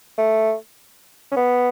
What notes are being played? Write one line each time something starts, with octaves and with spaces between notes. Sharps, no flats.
A3
C#4
B3